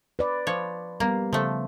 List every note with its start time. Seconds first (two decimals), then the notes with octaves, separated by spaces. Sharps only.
0.19 B4 D5
0.47 F3 C#5
1.00 G3 A#3 B3
1.33 C#3 F3 A3